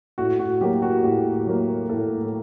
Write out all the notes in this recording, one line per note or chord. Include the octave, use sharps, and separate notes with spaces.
A2 F#4
F#4
F#3 A#3 G4
F#4
A2 G4
F#3 A#3
A2 A4